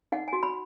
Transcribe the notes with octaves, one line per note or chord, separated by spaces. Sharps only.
D#4 F#5
G#5
F#4
B5